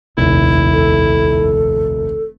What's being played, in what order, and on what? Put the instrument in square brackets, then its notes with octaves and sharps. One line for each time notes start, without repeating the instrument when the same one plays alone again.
[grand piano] F1 [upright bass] A#1 D#2 [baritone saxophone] E4
[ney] A4